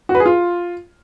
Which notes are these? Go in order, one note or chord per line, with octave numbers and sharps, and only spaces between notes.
F#4
B4
G#4
F4